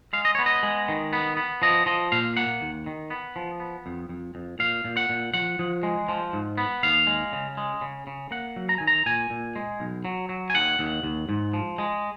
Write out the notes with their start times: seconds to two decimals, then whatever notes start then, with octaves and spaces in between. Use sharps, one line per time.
0.13 G#3 F5
0.25 D#5
0.35 B3 C#5
0.46 D#5
0.63 G#3
0.88 D#3
1.13 B3
1.37 B3
1.62 F3 D#5
1.86 F3 D#5
2.12 A#2 F5
2.37 A#3 F#5
2.61 D#2
2.86 D#3
3.10 B3
3.36 F3
3.60 B3
3.86 F2
4.09 F2
4.35 F2
4.59 A#2 F5
4.85 A#2
4.97 F#5
5.09 A#2
5.34 F3 F#5
5.59 F3
5.83 G#3
6.08 F3
6.33 G#2
6.58 B3
6.83 D#2 F5
7.07 G#3
7.33 C#3
7.57 G#3
7.81 C#3
8.07 C#3
8.31 A#3 F#5
8.56 F#3
8.69 A#5
8.78 D#3 G#5
8.87 A#5
9.06 A#2 G#5
9.30 A#2
9.56 G#3
9.80 B1
10.05 F#3
10.29 F#3
10.50 G#5
10.54 D#2 F#5
10.79 D#2
11.03 D#2
11.29 G#2
11.54 F3
11.78 G#3